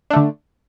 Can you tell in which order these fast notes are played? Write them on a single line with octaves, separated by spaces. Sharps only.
D4 A3 D3